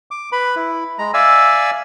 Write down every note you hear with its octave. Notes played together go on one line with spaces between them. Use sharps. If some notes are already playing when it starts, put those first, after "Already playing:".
D6
B4 B5
E4
G#3 A#5
D5 E5 F5 G#5 E6